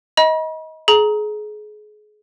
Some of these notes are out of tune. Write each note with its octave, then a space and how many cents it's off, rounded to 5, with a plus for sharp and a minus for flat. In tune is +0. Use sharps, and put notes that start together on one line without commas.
D#5 +25 B5 -45
G#4 +30 A#5 +10